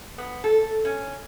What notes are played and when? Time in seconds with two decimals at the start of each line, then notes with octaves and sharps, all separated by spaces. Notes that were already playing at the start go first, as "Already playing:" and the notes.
0.18 B3
0.44 A4
0.85 C#4